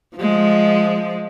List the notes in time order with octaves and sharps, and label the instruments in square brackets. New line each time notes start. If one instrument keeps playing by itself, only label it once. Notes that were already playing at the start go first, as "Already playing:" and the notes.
[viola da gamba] F3 G#3